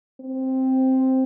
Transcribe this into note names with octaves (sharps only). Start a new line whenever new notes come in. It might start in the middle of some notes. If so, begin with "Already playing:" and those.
C4